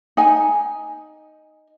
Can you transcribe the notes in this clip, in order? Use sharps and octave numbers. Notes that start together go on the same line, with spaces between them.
D#4 G#5